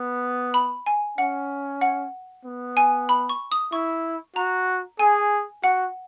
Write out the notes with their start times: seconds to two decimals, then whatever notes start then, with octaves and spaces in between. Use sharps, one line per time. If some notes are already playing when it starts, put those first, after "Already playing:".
Already playing: B3
0.54 B5
0.86 G#5
1.18 C#4 F#5
1.81 F#5
2.45 B3
2.77 G#5
3.09 B5
3.29 C#6
3.52 D#6
3.72 E4 C#6
4.36 F#4 A#5
4.99 G#4 G#5
5.63 F#4 F#5